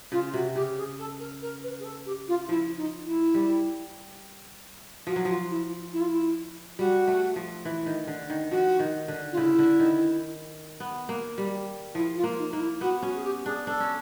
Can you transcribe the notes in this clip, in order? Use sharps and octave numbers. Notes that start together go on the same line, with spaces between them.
C#3 F4
C3 F#4
C#3 G4
G#4
A4
A#4
A#4
B4
G#4
A4
G4
F4
F3 E4
D#4
E4
G3
F3 F#4
F#3
F3 F4
E4
E4
F4
E4
G3 F#4
A3
F3
E3
D#3
D3
D#3
F3 F#4
D#3
D3
F4
C#3 E4
D3
D#3
B3
A#3
G3
F3 E4
F4
A#3
D#4
A#3 D#4
E4
B3 F#4
C#4 F#4
G#4
G4
D4 G#4
D4 A4
C#4